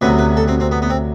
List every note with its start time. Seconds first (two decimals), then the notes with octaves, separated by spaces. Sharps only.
0.01 D2 C3 F#3 B3 B4
0.18 B4
0.37 A4
0.48 C4
0.60 C4
0.71 B3
0.82 B3
0.90 C4